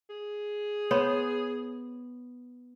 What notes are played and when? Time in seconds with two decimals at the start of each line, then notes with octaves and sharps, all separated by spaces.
0.09 G#4
0.91 B3 C5 C#5